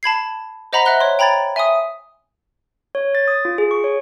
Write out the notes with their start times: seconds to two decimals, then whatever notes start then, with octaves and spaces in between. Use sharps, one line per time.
0.03 A5 B5 G#6 C7
0.73 C5 D#5 F#5 A#5 B5 B6
0.86 D#5 E5 F#5 F#6 G7
1.00 C#5 C6
1.19 G5 A#5 B5 G#6 A6
1.56 E5 G#5 C6 D#6
2.95 C#5
3.15 A6
3.28 D#6
3.45 F4
3.58 G#4
3.71 C#6
3.84 C#5